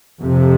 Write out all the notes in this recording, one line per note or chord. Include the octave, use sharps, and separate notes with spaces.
F2 C3